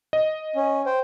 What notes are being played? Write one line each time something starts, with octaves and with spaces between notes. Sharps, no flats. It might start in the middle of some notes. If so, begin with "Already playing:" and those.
D#5
C#4
C5 G5